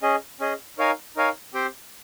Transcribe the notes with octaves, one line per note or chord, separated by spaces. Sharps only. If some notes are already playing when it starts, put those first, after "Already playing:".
C#4 G#4 D#5
C#4 G#4 D#5
D#4 A#4 C#5 F5 G#5
D#4 A#4 C#5 F5 G#5
C4 G4 C5 G5